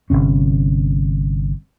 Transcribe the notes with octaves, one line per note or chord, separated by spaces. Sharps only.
G1 C#2 C3 C#4